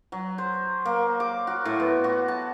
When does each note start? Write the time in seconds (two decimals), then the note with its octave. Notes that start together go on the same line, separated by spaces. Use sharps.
0.12 F#3
0.38 C5
0.85 A#3
1.20 D6
1.47 F#4
1.65 A2
1.80 B3
2.04 F#4
2.28 A5